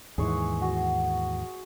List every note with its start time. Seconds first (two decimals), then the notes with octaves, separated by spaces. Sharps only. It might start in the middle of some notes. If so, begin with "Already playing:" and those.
0.18 D#2 G#2 E3 G#4 C6 C#6
0.62 F#4 C6